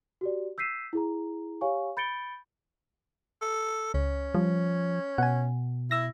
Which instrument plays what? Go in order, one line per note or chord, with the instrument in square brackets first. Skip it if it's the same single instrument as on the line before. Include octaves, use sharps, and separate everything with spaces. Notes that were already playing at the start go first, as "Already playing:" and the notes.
[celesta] F#4 G4 D5
E6 G6 B6 C7 D#7 E7
E4 G#4 A#5
G4 C#5 F5 G#5 C#6
B5 G6 A6 C#7 D7 G7
[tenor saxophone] A4
[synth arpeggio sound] C#2 [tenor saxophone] C#4
[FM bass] F3 [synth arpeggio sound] G3
[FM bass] B2 [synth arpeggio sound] F#5 G#5
[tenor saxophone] E4 [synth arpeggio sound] E6 A#6